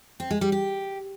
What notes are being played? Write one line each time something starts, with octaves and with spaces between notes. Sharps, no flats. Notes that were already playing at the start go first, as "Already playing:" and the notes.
C4
G#3
G3
G4